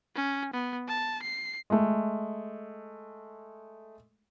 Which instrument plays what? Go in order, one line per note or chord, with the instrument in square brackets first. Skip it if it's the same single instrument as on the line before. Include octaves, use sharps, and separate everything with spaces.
[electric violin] C#4
B3
A5
C7
[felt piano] G#3 A3